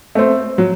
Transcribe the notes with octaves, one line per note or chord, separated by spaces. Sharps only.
A3 C4
F#3